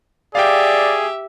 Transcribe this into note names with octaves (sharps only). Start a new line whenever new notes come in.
G4 G#4 D5 E5 F5 G5